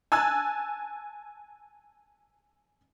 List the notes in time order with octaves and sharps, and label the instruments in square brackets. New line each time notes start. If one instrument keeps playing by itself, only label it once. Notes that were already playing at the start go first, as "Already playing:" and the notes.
[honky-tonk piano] G#5 A5 E6 F#6 G#6